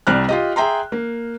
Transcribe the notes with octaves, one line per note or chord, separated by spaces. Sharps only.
C2 G3 D5 F6 F#6
F4 G4 D#5
G#4 E5 G5 A#5 C6
A#3